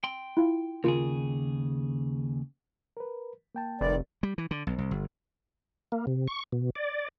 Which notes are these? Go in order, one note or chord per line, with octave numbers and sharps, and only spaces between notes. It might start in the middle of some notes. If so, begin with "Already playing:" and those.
G5 C6
E4 F4 F5
D#2 C#3 F4 G#4 A#4
A#4 B4
A#3 G5 A5
F1 D#3 B4 D5
G3
E3
D3
B1
C2
G1
A#3
C3
C#6
B2
D5